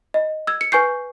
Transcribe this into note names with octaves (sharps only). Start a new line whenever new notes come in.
D#5
E6 G#6
C#7
B4 G#5 C#6 G6 C7